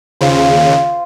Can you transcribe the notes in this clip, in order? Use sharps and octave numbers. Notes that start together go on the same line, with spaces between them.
D#2 C#3 F4 C5